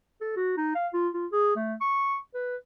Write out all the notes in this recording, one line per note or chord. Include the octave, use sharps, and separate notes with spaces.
A4
F#4
D#4
F5
F4
F4
G#4
A3
C#6
B4